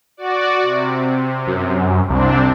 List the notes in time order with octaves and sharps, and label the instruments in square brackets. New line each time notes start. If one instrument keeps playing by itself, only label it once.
[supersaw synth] F#4 D5
C3
[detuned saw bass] F#2
[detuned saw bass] C2 [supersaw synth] C3 C4 D4